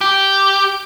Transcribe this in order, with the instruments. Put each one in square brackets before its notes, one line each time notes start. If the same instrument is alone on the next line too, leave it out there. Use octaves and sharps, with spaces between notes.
[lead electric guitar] G4